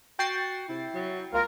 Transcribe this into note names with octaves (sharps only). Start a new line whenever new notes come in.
F#4 G5 A6 C7
C3 E4
F#3
C#2 A#3 F4 A#4